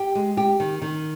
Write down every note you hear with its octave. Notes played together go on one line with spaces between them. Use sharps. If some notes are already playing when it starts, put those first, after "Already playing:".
Already playing: G4
G#3
G4
D#3
D#3